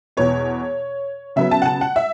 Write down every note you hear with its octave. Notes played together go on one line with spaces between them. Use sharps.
E2 B2 B3 C#5
C#3 F#3 B3 E5
A5
F#5
A5
F#5
E5